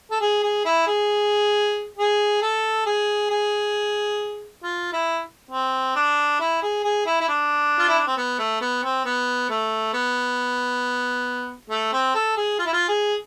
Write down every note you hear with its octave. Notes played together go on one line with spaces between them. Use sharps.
A4
G#4
G#4
E4
G#4
G#4
A4
G#4
G#4
F4
E4
C4
D4
E4
G#4
G#4
E4
E4
D4
F4
E4
D4
C4
B3
A3
B3
C4
B3
A3
B3
A3
C4
A4
G#4
F4
E4
F4
G#4